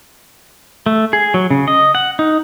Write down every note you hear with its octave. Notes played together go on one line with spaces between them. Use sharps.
A3
G#4
F#3
C#3
D#5
F#5
D#4